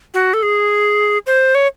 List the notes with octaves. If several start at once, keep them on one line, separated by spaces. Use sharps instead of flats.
F#4
A4
G#4
C5
C#5